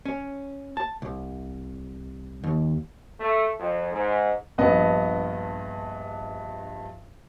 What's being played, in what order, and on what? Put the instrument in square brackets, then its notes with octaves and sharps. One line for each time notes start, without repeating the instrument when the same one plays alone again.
[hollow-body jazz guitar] C#4
A5
C2
D#2
[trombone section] A3
F2
G#2
[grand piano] A#1 G2 B3 D#5